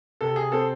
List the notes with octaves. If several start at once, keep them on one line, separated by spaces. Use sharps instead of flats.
C3 A4
G#4
C4 A4